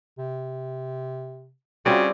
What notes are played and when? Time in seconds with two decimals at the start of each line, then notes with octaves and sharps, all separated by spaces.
0.19 C3
1.86 C#3 G3 C4 F4 F#4